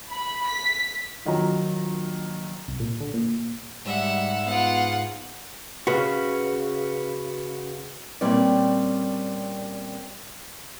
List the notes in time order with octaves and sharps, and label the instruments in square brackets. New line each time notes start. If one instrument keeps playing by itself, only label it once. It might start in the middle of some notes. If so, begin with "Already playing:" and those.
[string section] B5
B6
[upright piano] A#1 D#3 F#3 A#5
[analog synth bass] C2
A#2
D3
A#2
[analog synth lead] G#2 [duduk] G3 [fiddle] E5 F#5
[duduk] B3 [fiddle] F4 F#5
[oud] C#3 [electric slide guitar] F#4 B4
[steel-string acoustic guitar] A#2 G3 C4 C#4 D5